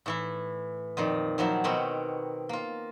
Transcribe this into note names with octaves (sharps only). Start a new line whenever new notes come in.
A2 E3 E4
F2 A#2 D#3
D#3 F3 F#3 E4
B2 D#3 C4 A#4 C#5 B5
A#3 F4